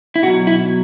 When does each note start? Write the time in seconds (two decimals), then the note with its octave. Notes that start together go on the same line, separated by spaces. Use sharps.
0.16 E4
0.22 B2 F#4
0.27 F#3
0.47 E4